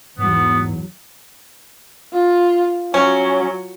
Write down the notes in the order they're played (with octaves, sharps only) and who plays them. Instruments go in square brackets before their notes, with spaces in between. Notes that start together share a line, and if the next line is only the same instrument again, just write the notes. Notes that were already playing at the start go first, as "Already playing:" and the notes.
[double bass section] E2 F#3 [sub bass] G#2 [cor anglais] B3
[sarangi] F4
[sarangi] F#3 [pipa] C#4